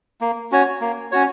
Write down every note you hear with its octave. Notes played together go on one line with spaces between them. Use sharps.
A#3
C#4 F#4 C#5
A#3
C#4 F#4 C#5